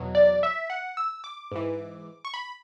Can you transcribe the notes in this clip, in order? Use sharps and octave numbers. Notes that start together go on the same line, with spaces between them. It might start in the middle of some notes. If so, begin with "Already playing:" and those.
Already playing: E2 B2 F#3
D5
E5
F#5
E6
D6
G#2 E3
C#6
B5